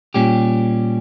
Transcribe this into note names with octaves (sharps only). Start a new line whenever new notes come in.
A#2 G3 C#4 G4